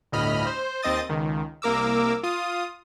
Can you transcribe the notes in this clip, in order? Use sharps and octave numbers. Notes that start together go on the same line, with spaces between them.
G1 D2 A2 D#5 B5 F6
C5
D#2 C4 D#5 D#6 A6
C#2 D#3
C2 A#3 A#4 D6 E6
F4 D#6